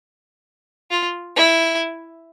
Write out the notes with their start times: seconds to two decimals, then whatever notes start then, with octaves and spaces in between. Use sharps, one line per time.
0.91 F4
1.36 E4